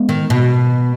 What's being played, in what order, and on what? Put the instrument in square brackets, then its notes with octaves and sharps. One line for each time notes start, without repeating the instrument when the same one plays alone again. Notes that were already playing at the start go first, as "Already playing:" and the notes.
Already playing: [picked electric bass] G#3 B3
[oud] D#3
B2